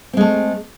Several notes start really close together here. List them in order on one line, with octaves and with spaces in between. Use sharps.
C4 G#3 A3